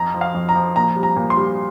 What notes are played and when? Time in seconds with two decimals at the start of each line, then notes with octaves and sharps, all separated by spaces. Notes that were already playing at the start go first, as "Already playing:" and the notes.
Already playing: F2 A#5
0.14 F3
0.21 F5
0.35 F2
0.49 A#5
0.55 F3
0.76 A#2 A#5
0.96 G3
1.03 A#5
1.16 A#2
1.30 C6
1.37 G3